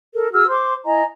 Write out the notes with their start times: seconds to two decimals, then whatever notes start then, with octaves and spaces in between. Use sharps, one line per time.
0.13 A4 A#4
0.32 F#4 G#4 E6 F6
0.48 C5 C6 D6
0.85 E4 D#5 G#5 A#5